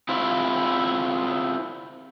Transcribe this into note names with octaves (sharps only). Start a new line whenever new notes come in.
C4 E4 F4